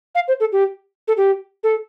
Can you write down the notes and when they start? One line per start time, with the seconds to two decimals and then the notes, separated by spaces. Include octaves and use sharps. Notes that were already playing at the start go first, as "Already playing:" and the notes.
0.15 F5
0.28 C5
0.40 A4
0.52 G4
1.08 A4
1.17 G4
1.64 A4